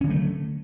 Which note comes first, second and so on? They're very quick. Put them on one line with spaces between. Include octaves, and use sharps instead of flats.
C#4 D3 F#3 A3